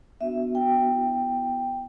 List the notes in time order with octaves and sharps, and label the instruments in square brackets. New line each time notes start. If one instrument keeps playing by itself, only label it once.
[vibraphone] B3 D4 F#4 E5
G5
B3 E4